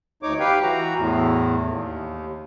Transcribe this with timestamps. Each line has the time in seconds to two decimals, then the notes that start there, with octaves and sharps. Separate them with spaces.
0.23 D2 D#4 C#5 D6
0.40 G4 B4 F5 G5
0.62 E3 F#4 A#5
0.96 E2 A2
1.66 D#2